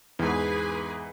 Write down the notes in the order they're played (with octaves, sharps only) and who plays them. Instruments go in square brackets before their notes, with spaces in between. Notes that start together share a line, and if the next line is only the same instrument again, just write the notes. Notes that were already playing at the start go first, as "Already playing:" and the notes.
[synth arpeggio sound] E2 [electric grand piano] G#2 E3 [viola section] G#4 B4 G#5